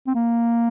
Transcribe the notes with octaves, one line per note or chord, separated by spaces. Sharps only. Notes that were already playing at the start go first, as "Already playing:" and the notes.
C4
A#3